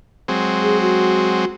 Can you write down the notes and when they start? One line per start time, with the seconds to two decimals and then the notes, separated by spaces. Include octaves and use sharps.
0.28 F#3 G#3 C4
0.63 G#4
0.82 F#4